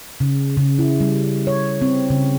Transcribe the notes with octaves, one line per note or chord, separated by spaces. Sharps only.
C#3
C#3
E4
G3
C#5
C4
C#3